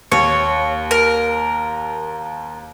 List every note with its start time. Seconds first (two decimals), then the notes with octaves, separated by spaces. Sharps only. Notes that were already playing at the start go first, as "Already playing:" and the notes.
0.12 D#2 C#5
0.91 A#4